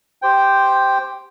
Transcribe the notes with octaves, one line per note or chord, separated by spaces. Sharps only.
G4 C5 G5